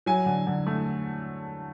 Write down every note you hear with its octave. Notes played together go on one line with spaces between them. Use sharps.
F#3 G#5
D3
D3
A3